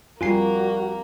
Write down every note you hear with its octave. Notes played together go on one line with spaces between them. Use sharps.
F2 G3 A#3 F4 F#4 A#4 G#5 C7